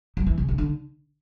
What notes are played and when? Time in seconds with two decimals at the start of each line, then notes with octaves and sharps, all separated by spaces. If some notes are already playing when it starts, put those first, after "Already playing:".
0.17 F#3
0.27 E3
0.38 C#3
0.49 C#3
0.58 D3